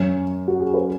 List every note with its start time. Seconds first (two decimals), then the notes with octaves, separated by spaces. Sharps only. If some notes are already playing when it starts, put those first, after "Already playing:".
Already playing: F#2 F#3 C#4
0.48 F#4
0.60 G#4
0.74 B4